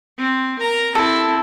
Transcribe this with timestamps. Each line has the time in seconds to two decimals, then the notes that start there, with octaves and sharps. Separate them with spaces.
0.19 C4
0.59 A#4 A#5
0.95 C4 E4 A4